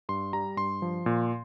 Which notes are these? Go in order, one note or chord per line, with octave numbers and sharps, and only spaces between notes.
G2 C6
G3 A#5
G2 C6
F3
A#2